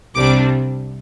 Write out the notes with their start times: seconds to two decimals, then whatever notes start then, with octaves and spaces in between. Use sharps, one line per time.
0.14 C2 C3 G3 D4 D6